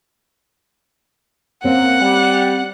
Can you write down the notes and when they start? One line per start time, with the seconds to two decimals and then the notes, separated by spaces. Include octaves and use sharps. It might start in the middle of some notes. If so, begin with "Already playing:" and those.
1.64 A#3 C4 C#4 F#5
1.99 G3